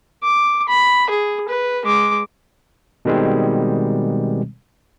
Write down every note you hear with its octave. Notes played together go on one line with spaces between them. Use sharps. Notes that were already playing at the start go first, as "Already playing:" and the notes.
D6
B5
G#4
B4
G#3 D6
B2 D#3 G3 G#3 C4